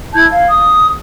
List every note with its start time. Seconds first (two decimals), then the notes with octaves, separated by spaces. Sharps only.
0.14 E4 A5 G6 G#6
0.31 F5
0.49 D#6